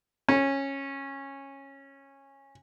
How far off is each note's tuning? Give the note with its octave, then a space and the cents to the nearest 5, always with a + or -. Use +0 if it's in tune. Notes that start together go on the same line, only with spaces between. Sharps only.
C#4 -15